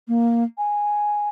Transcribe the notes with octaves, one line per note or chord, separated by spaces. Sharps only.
A#3
G#5